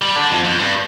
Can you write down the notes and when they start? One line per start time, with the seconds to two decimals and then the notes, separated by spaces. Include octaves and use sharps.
0.02 G3
0.16 D3
0.31 F2
0.44 F2
0.59 G2